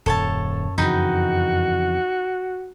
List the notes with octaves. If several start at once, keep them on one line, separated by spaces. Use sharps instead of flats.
D#1 F#2 A4 C#5 A5
F2 C#3 E3 D#4 F#4 G5 B5